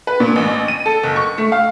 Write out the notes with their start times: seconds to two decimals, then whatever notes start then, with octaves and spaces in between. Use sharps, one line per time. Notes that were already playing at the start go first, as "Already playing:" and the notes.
0.07 B4
0.20 A#2
0.36 A1
0.68 D#7
0.86 A4
1.03 F#1
1.16 C#6
1.38 A3
1.52 F5